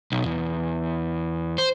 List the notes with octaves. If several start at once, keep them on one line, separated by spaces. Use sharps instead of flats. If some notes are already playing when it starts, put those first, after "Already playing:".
B1
E2
C5